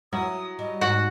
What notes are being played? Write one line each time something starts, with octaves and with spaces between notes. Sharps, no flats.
F#3 E4 D#6
G3 D#5
G#2 F#4 F#5